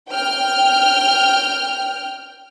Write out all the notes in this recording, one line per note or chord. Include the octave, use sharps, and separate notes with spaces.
G5 F6